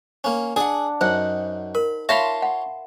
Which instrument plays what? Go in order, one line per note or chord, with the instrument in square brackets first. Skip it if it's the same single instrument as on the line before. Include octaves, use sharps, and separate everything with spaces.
[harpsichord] A#3 C#4
[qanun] D4 F#5 [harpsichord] G#4 G#5
[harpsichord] F#2 [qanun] D#4 F#5 [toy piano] C5
[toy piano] A#4 [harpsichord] B5
[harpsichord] F4 C#5 [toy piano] E5 F5 B5 [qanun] A5 C6
[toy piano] F#5